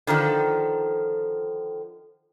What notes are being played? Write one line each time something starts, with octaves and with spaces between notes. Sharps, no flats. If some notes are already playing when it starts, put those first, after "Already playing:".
D3 D#3 F3 A4